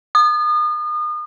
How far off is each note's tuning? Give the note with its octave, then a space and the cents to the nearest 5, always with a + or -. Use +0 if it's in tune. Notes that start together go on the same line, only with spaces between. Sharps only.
D#6 -35